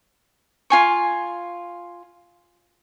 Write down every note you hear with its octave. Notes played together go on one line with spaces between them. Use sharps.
F4 G#5 C#6